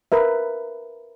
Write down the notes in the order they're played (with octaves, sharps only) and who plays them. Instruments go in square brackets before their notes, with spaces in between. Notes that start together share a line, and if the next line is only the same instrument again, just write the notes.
[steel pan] A#4 B4 E5